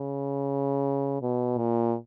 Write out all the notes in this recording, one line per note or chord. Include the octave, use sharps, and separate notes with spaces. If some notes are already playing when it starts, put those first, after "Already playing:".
Already playing: C#3
B2
A#2